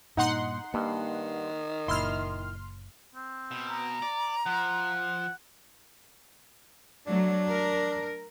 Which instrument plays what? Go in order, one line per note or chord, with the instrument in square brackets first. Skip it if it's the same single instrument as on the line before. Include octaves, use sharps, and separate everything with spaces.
[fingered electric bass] G2 A#2 [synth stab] D#4 F#5 C6 [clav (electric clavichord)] D#5
[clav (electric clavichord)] G2 [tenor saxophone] D#3 [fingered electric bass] A#3
[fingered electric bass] F#1 A#2 [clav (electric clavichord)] E4 [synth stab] C6 F6
[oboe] C4
[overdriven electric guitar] B2
[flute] A#5
[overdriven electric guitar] D5
[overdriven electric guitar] F3 [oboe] F#5
[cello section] F#3 A3 [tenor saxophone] D4
[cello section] A#4